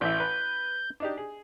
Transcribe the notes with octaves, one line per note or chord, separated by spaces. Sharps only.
A1 E3 E5 G6
B4
D4 D#4 G4
G#4